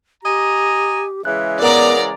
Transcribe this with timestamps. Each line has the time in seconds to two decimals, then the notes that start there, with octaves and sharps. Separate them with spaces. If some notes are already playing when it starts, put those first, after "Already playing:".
0.24 G4 D#5 G#5 A#5
1.25 C#3 E3 G#3 E5 F#6
1.62 B3 A#4 D5 F#5 A#5 D#6